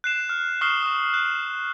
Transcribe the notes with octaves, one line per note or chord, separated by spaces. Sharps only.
F#6 C7 E7
F6
C#6 D#6 F6 C7 G7
C#6 D#6
F#6